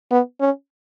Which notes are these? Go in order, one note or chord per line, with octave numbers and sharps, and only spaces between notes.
B3
C#4